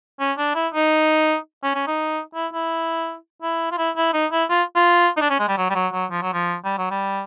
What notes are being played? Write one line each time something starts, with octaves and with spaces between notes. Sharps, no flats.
C#4
D4
E4
D#4
C#4
C#4
D#4
E4
E4
E4
F4
E4
E4
D#4
E4
F4
F4
D#4
D4
C#4
G#3
G3
F#3
G3
F#3
F#3
F3
F#3
F3
G3
F#3
G3